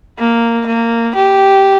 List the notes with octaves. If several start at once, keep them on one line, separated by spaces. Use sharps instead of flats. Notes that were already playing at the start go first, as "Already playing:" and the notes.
A#3
A#3
G4